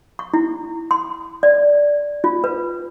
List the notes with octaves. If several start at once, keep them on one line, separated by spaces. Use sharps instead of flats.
C#6
E4
C6
D5
F4
B4